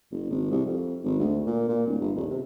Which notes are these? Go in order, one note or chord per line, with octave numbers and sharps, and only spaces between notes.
F#1
G#1
C2
F2
G#1
D2
A#2
A#2
D1
G1
D#1
C3